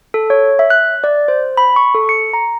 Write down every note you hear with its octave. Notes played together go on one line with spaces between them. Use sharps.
A4
C#5
E5
F#6
D5
C5
B5
C#6
A4
C#7
A#5